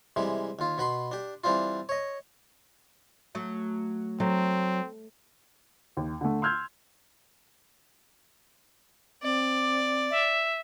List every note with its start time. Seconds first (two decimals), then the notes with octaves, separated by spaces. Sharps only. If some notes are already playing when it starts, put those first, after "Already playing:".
0.16 C3 E3 G3 G#3
0.59 D#2 F4
0.78 B2 B4 B5 C6
1.11 D4 G4
1.44 E3 G3 C4 D4 F4
1.89 C#5 D#5
3.35 F#3 A3
4.20 F#3 A3 C4
5.97 D#2
6.21 D3 A3
6.42 C6 E6 F6 G6 G#6
9.23 C4 D5
10.11 E5